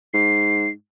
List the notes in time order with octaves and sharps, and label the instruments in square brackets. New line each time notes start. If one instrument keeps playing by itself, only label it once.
[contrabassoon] G#2 [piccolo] C7